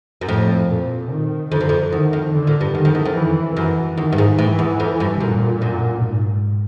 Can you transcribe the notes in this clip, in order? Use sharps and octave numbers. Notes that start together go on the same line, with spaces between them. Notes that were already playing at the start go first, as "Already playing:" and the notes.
F#2
F2 A2
A#2
D#3
F2 D3
F#2
F2
E2 D#3
F2
D3
A#2
G2
F#2 D#3
F2
E2
F2
E3
F#2 E3
E2 D#3
G2
G#2
A2 E3
E2
F2
G2
F#2 A#2
F#2
G#2